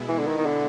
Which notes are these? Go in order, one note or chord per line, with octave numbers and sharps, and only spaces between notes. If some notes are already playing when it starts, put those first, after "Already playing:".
Already playing: B2 G#3 B3 E4
E3
D3
D#3
D#3
D3